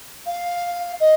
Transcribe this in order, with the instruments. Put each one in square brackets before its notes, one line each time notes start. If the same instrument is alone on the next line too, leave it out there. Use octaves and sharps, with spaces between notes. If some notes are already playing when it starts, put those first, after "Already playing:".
[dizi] F5
D#5